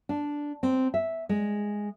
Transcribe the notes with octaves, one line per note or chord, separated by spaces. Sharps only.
D4
C4
E5
G#3